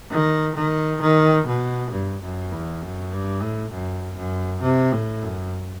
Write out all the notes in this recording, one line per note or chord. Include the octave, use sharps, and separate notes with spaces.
D#3
D#3
D#3
B2
G2
F#2
E2
F#2
G2
A2
F#2
F#2
C3
A2
F#2